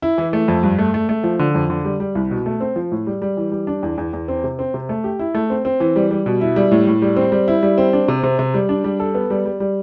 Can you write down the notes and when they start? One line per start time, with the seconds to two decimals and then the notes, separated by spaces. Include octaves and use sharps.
0.02 E4
0.18 E3
0.33 A3
0.48 F2
0.63 G2
0.78 A3
0.94 A3
1.09 A3
1.24 F3
1.39 D3
1.55 F2
1.70 D3
1.85 G3
2.00 G3
2.15 C2
2.31 B2
2.46 A3
2.61 C4
2.76 F3
2.92 A2
3.07 G3
3.22 G3
3.37 E3
3.52 G3
3.67 D4
3.83 E2
3.98 E2
4.13 E2
4.28 C4
4.44 C3
4.59 C4
4.74 C3
4.89 A3
5.04 G4
5.19 E4
5.35 A3
5.50 C4
5.65 C4
5.80 E3
5.96 G3
6.11 G3
6.26 B2
6.41 E4
6.56 G3
6.71 A2
6.87 A2
7.02 G3
7.17 C4
7.32 G3
7.48 E4
7.63 G3
7.78 C4
7.93 D4
8.08 C3
8.23 C3
8.39 C3
8.54 G3
8.69 D4
8.84 G3
9.00 A4
9.15 B3
9.30 G3
9.45 G3
9.60 G3